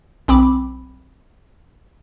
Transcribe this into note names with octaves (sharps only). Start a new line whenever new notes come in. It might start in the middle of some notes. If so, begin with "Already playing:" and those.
B1 C4 B5 D6